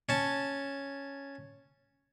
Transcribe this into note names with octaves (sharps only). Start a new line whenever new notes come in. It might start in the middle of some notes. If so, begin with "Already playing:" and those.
C#4 A5